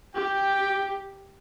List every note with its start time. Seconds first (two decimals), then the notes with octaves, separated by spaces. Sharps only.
0.15 G4 G5